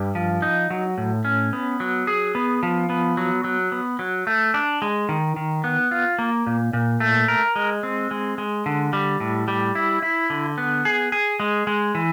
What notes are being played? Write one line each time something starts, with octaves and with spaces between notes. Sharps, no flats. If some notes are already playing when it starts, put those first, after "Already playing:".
Already playing: G2 G3
F3
D#4
F#3
A2
C#4
B3
F#3
G#4
B3
F3
B3
F#3
F#3
B3
F#3
A3
D4
G#3
D#3
D#3
B3
F4
A#3
A#2
A#2
A3
A#4
G#3
C4
G#3
G#3
D3
G3
A2
G3
E4
E4
D3
B3
G#4
G#4
G#3
G#3
E3